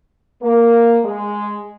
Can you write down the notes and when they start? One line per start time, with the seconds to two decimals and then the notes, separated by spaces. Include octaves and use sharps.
0.42 A#3
1.03 G#3